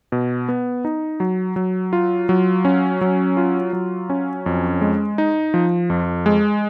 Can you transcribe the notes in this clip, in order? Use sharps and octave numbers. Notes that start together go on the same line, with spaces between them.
B2
B3
D#4
F#3
F#3
F4
F#3
C#4
F#3
F4
F#3
C#4
F2
G#3
D#4
F3
F2
G#3